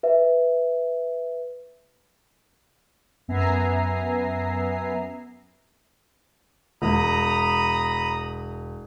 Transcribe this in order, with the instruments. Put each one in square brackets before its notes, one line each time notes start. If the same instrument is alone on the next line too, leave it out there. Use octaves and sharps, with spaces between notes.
[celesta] B4 E5
[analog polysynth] F#2 B3 E5 G#5 A#5 C7
[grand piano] E1 [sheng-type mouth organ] A#5 B5 D#6